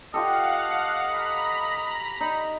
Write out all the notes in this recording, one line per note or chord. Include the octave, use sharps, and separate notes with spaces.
F4 G4 A4 D#5 F5 F#5
A#5 B5
D#4